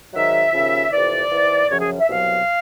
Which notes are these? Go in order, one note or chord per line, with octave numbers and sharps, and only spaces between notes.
G#2 D#3 F#3 E5
D#2 C#3 F3
F2 C3 E3 D5
G#2 E3
F#2 C#3 F3 C#5
G#4
E5
C2 B2 F#3 F5